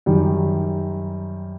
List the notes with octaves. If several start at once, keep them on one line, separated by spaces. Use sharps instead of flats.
F#2 D#3 G3